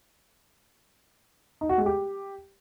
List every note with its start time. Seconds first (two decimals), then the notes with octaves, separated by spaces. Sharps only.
1.61 D#4
1.69 F#4
1.78 G#3
1.86 G4